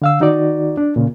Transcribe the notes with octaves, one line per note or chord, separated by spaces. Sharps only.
D3 F5 E6
D#3 D#4 F#4 D5
D4
A#2 C#3